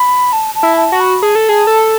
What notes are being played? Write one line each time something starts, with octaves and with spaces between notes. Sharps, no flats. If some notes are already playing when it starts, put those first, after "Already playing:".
Already playing: B5
A5
A5
E4
A5
F#4
B5
G#4 A5
A4
G#4
A4